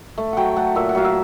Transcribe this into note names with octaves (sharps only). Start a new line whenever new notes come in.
A3
F#3 F#5 G5
A3 F#5
A#2 E5
F#5
F#3 F5
E5